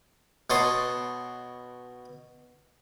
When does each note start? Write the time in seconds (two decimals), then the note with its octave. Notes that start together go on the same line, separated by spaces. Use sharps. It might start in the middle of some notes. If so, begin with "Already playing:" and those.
0.50 B2 C#5 A5 C6 D#6